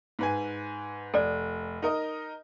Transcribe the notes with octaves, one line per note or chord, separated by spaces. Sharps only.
G#2 B4 G#5
F1 A4 D5
D#4 A#4 D#5